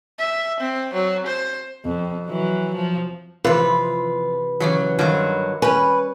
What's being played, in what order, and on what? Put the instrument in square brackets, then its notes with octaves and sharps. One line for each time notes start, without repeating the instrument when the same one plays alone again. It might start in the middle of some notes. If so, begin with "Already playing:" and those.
[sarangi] E5
C4
F#3
C5
[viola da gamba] F2
E3 F#3
F3
[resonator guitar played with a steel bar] F2 F4 [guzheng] C3 E3 [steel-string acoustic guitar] B4
[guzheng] C#3 E3 G#4 [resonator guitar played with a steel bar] F#3
[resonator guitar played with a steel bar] G2 D3 F#3 [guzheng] D#3 C5
[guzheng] G3 C#4 [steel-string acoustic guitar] B4 [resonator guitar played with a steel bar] G#5